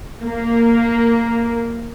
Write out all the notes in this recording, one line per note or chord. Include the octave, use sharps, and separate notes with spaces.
A#3